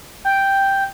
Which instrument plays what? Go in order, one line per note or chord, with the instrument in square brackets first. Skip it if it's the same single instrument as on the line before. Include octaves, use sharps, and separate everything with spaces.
[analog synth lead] G5